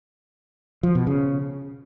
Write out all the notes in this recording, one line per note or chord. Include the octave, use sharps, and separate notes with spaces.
F3
B2
C#3